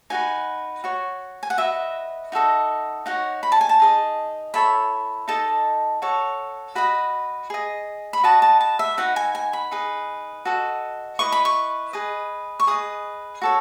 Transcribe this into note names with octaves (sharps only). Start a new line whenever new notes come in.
D#4 F#4 B4 G#5
F#4 C#5
G#5
F#5
F#4 B4 D#5 E5
D#4 F#4 A4 D#5
D#4 F#4 C#5 F#5
B5
A5
G#5
A5
D#4 G#4 D#5
E4 A4 C#5 B5
D#4 A4 D#5 A5
F#4 A4 C#5
F#4 B4 D#5 B5
G#4 D#5
B5
F#4 B4 D#5 A5
A5
A5
E5
D#4 F#4 B4 F#5
G#5
G#5
B5
D#4 G#4 B4
F#4 A4 D#5
E4 B4 D#5 C#6
B5
C#6
G#4 B4 D#5
C#6
G#4 B4 D#5 D#6
F#4 A4 C#5